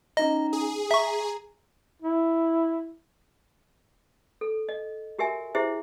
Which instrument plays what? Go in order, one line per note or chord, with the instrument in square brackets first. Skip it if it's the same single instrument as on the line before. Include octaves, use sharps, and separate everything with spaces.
[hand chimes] C#4 D#4 A#5 [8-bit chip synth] D#5
[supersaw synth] G#4
[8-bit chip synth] E5 C#6 [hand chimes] A#5
[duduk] E4
[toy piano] A4
D#5
F#4 G4 A#4 E5 G#5
E4 G4 G#4 C5 E5